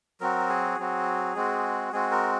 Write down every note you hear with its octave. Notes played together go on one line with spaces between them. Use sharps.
F#3 C4 F#4 A#4
G#4
F#3 C4 F#4
G#3 C4 F#4
G#3 C4 F#4 G#4
A#4